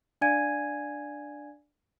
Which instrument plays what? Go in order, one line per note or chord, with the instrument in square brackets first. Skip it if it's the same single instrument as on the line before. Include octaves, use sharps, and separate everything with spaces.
[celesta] D4 D5 F5 G#5 G#6 D#7